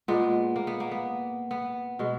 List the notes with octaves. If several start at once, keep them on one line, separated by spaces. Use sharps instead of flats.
A#2 G#3 B3
A#3
B3
A#3
B3
B3
B2 G#3